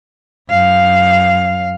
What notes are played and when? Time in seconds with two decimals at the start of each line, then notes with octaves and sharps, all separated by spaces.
0.50 F#2 F5